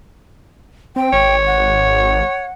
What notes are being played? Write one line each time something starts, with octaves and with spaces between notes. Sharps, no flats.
C4 G5
G#1 C#5
F#5